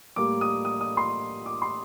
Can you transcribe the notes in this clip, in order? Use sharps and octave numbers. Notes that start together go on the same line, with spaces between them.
A2 G3 A#3 D6
D#6
D#6
D#6
C6
D6
C6